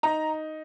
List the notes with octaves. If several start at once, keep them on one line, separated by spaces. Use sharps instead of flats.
D#4 A#5